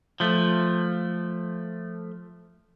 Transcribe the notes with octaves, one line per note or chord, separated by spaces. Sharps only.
F3 A3